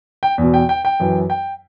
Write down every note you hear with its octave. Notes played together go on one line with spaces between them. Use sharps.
G5
E2 B2
G5
G5
G5
F#2 E3
G5